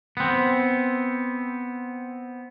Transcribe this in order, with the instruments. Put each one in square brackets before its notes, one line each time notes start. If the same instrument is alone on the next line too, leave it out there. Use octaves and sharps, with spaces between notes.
[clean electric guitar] B3 C4